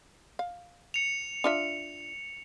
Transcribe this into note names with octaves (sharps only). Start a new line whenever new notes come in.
F5
C#7 F7
D4 F4 E5